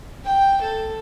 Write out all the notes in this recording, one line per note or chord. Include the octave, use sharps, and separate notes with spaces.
G5
A4